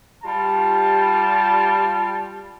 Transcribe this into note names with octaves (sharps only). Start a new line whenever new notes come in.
G3 F4 A5